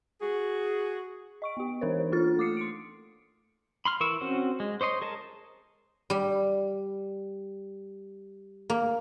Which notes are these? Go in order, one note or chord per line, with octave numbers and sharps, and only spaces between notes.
F#4 G#4
D#5 C#6 D7
B3 G4
E3 D4 D#4 A#4 C5 C#5
A#3 D4 F4 A4 F6 A6
A3 D6 D#6 C7 C#7
C6 C#7 D7
B5 C6 F6
E3 A#4 C#6 E6
C4 C#4 F#4 C5
G#3
C5 C#5 D#5 C6
G#4 A#4 D#5 A5
G3
A#3